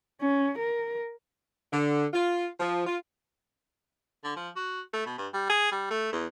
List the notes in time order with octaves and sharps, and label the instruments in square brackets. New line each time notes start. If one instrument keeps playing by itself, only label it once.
[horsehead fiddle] C#4
A#4
[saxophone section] D3
F4
F3
F4
[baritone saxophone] D3
F3
F#4
A3
B2
G2
G3
G#4
G3
A3
E2